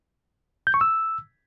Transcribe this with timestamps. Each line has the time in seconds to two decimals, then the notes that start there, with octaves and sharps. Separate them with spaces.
0.67 G6
0.74 C#6
0.81 E6